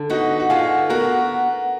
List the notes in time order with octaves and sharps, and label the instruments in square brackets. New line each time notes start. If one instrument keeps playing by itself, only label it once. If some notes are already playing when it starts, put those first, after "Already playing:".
Already playing: [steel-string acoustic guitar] D3
[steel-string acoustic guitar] B3 [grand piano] D#4 F#4
[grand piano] F#4
[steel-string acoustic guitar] D3 [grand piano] F4 G#4
[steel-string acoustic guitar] B3 [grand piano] F#4 A#4